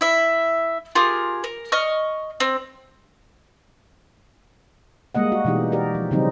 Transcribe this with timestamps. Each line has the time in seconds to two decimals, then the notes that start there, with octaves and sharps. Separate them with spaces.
0.01 E4 E5
0.95 F4 G4 G#4 A#4
1.44 A#4
1.72 D#5 C#6 F6
2.40 C4
5.15 G3 G#3 A#3 D#5 F#5
5.32 F#4
5.45 B2 E3 G#3 D#4 G4
5.72 F#4 G4 A#4 D5
5.95 F3
6.11 C#3 E3 F#3 G3 C4 D#4